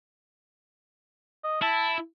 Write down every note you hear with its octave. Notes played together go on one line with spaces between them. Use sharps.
D#5
E4 A5